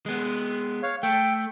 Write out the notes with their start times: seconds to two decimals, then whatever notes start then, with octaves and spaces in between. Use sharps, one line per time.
0.06 G#3 B3
0.83 C#5 F5
1.03 A3 G5